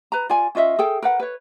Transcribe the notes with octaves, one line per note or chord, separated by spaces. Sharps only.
B4 A#5
F4 D5 G#5
C#4 F4 D#5 E5
G#4 A4 G5
A#4 B4 F#5
B4 C#5